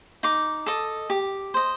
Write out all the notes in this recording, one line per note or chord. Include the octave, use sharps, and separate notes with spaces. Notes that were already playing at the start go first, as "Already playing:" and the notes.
D#4 D6
A4 D#5
G4
C5 D#5